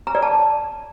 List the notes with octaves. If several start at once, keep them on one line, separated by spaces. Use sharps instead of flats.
A#5
D5
A5